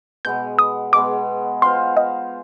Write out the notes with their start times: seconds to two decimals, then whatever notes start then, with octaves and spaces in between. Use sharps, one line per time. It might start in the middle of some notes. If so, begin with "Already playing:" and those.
0.25 B2 G#3 B3 G6
0.59 D#6
0.93 B2 G#3 B3 D6
1.62 B3 F4 C5 F5 C6
1.97 D#5